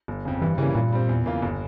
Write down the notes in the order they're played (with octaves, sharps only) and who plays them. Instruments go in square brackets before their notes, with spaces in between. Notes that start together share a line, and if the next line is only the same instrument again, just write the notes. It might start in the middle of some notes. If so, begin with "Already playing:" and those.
[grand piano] G1
F2 C#3
[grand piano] G2 [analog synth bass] E3
[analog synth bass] C#3 [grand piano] E3 G3 A#3 C#4
[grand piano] G2 [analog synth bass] A#2
[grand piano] G3 C4
E2
C#3 E3 A#3 F4
G1